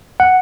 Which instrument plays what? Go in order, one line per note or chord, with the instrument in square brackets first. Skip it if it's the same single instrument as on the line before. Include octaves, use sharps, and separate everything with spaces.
[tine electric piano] F#5